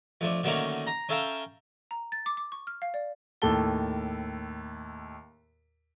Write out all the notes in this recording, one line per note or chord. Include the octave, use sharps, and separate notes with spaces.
F2 A3 D4
D3 D#3 F#3 A3 A#3 C#4
A#5
C#4 A4 E5 F5 G5 A#5
A#5
A6
D6
D6
C#6
F6
F5
D5
D#2 A2 A4 A5 G7